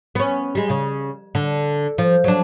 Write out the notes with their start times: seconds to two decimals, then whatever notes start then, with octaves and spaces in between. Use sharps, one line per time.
0.15 B3 C#4
0.55 G3 G#3
0.70 C#3
1.35 D3
1.98 F3
2.24 F#3 D4